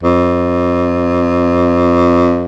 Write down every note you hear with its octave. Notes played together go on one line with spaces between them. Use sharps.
F2